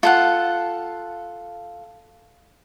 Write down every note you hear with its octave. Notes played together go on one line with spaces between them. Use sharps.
F4 A4 F#5